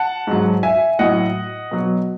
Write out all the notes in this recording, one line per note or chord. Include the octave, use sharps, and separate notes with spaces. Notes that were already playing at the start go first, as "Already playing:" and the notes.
Already playing: F#5 A5
G#2 F#3
E5 G#5
A2 F#3 D#5 F#5
B2 F#3